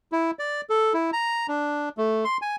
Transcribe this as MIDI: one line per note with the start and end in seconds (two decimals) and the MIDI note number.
0.12 0.31 64
0.39 0.61 74
0.70 0.93 69
0.94 1.11 64
1.13 1.47 82
1.48 1.89 62
1.98 2.24 57
2.25 2.37 84
2.42 2.56 80